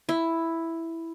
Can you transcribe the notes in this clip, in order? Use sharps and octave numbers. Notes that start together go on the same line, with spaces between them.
E4